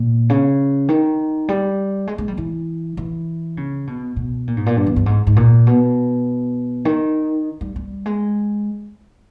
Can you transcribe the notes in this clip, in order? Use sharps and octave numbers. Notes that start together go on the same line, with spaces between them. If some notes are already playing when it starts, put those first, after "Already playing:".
Already playing: A#2
C#3
D#3
G3
G#3
G#3
G3
E3
E3
C#3
B2
B2
A#2
G#2
A#2
G2
E2
G2
G#2
G#2
A#2
B2
D#3
G3
G3
G#3